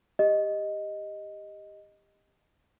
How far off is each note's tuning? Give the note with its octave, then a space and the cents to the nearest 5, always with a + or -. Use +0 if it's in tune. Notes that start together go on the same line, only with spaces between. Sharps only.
G4 +15 D#5 +0